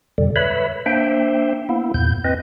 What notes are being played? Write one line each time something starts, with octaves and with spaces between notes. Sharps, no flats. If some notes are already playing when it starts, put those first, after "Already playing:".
F2 B2 D3 G3
B4 C#5 E5 B5
A#3 D4 C5 E5 G5
A#3 B3 E4
E2 G2 A#2 G6
C4 B4 D#5